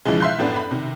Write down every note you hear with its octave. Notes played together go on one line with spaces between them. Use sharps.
B1 C#3 E3 F3 G#3
E5 F5 C6 F#6 G6
F#2 A2 B3 D4
B5
C3 D#3